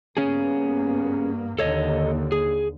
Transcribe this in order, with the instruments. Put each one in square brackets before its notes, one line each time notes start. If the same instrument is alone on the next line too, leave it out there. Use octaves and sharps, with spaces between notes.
[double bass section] G2 A#3 B3 [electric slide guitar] C#4 G#4
[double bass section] D#2 D3 [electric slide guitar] A4 C#5 D#5
[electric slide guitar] G#4